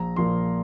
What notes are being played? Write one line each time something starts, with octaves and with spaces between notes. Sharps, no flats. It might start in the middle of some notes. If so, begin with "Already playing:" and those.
Already playing: A#1 A#5
A#2 F3 A#3 C6